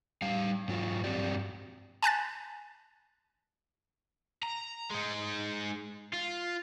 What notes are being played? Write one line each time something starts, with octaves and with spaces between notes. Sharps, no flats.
G3 F5
G#2 F#3 F4
G2 C4 F#4 G4 D5
G#5 A5 F#6 A6
A#5
G#3 D#4
F4